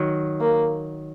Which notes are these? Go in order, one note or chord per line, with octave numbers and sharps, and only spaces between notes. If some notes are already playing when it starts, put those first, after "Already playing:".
Already playing: D#3 F#3
A#3